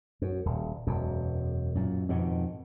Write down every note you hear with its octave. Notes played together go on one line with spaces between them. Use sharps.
F#2
D#1
E1 F#2
F#2 A#2
F2 G#2 B2 D#3